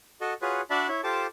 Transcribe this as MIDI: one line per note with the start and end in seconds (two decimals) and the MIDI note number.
0.21 0.34 66
0.21 0.34 69
0.21 0.34 75
0.42 0.61 65
0.42 0.61 66
0.42 0.61 68
0.42 0.61 71
0.42 0.61 73
0.70 0.88 62
0.70 0.88 66
0.70 0.88 74
0.70 0.88 76
0.70 0.88 81
0.70 0.88 83
0.88 1.01 64
0.88 1.01 73
0.88 1.01 76
1.04 1.27 65
1.04 1.27 67
1.04 1.27 69
1.04 1.27 72
1.04 1.27 81
1.04 1.27 86